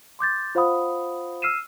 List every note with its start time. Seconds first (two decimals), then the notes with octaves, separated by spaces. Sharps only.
0.19 C6 D6 G6 A6
0.55 F4 C5 F5 F#5 B5 D#6
1.42 E6 F6 C7 D#7 E7